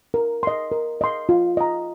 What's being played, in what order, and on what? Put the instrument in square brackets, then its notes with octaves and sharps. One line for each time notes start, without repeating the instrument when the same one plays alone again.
[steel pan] A#4
D#5 C6
A#4
D#5 C6
F4
D#5 A#5